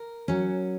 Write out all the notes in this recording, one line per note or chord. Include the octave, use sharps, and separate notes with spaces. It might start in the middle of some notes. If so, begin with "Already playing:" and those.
Already playing: A#4
F#3 C#4